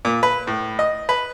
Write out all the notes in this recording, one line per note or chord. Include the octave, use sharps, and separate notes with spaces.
A#2
B4
A2
D#5
B4